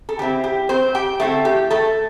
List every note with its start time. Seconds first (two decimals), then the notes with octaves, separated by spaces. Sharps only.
0.09 A4
0.19 D3 G3 C4 E4 G4
0.44 G4
0.69 C4 C5
0.95 G4 G5
1.20 D3 A3 C4 E4 A4
1.45 G4
1.71 A3 A4